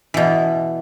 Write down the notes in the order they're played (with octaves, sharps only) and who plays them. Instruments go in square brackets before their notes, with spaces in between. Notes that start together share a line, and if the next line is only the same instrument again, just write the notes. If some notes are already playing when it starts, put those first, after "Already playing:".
[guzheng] B2 E3